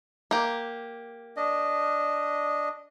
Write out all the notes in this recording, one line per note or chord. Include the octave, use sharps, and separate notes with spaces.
A#3 G4
D4 D#5